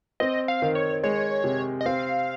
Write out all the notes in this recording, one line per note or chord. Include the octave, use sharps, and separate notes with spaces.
C4 D#5
F5
D#3
C#5
G#3 C#5
C3
D#5
C4 F5